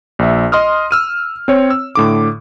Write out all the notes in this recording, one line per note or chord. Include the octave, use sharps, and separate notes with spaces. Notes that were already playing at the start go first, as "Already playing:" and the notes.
A#1 E5
D#5 C6 D#6 F6
E6 F6 D#7
C4 C#5
E6
A2 D3 D6